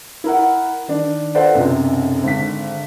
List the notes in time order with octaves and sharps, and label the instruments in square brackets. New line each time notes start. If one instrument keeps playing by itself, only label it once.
[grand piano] E4 A#4 F#5
D#3 D4
F4 A4 B4 C5 D5 F#5
B1 F#2 C3
G#1 D3 B6